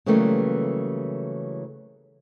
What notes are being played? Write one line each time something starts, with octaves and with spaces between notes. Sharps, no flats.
C#3 E3 F#3 G3 A3 A#3